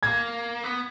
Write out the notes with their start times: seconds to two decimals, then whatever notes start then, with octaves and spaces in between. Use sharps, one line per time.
0.03 A#3 G#6
0.64 B3